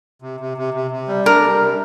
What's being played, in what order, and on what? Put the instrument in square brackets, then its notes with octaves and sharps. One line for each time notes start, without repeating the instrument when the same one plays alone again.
[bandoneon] C3
C3
C3
C3
C3
G3
[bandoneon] D4 [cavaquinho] A#4
[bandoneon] G3
C3